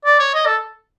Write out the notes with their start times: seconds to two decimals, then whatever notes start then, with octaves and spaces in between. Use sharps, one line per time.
0.05 D5
0.19 C#5
0.34 D#5
0.46 A4